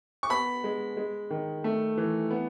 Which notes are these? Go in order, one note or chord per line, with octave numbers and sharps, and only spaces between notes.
C#6
B3 B5
G#3
G#3
D#3
A3
E3
B3